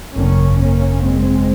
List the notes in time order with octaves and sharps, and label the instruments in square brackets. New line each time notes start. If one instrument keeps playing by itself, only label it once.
[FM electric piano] G#1 F#2 C#3 [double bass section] A#3 C#4
[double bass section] A#3 C#4
G#3 C4